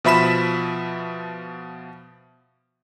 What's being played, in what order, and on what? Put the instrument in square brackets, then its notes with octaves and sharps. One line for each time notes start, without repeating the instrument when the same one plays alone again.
[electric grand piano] B2 F3 E5 B5 B6 E7